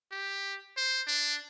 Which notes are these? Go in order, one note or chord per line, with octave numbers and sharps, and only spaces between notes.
G4
C5
D4